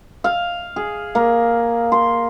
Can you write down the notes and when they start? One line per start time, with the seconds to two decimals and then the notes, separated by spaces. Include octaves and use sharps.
0.24 F5
0.76 G#4
1.15 A#3
1.92 C6